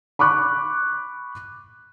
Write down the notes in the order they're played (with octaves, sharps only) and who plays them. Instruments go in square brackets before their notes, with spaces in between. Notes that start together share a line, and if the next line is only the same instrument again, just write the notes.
[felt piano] B5 C#6 D6 F#6